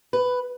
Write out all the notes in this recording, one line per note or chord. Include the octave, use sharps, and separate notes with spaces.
B4